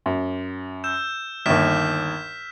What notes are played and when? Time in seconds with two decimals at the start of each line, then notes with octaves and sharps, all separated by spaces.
0.06 F#2
0.84 E6 G6 E7
1.46 G1 D#2 F6 B6 E7